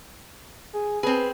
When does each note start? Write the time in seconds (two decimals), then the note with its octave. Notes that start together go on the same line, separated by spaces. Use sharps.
0.73 G#4
1.03 C4 G#4 B4